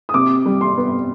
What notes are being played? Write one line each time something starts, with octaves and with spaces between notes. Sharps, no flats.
D#6
C3 D6
G3
C6
B3